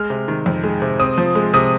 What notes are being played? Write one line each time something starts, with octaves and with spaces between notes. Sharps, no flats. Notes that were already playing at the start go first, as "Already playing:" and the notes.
Already playing: G#3 F6
C3
D#3
F2
G#3
C3
C4 D#6
F3
G#3
C3 D#6